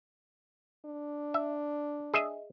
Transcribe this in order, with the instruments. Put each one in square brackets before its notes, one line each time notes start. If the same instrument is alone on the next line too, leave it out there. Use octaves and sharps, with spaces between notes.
[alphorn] D4
[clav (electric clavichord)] E5
G#4 D#5 E5